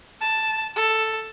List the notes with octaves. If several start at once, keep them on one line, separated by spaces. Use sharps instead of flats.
A5
A4